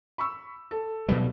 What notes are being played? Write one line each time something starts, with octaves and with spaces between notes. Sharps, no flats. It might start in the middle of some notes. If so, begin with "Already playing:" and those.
B5 C#6 E6
A4
B2 F#3 G3 B4